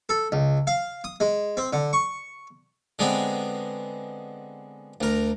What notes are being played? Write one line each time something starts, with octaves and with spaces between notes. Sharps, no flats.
A4
C#2
F5
D#6
G#3
C4
D3
C#6
D3 G#3 B3 C4
D2 A#4